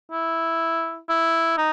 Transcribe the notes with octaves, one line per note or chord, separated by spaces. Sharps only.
E4
E4
D#4